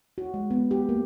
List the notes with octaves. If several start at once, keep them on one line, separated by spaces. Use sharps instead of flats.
F#4
G#3
B3
G4
A#3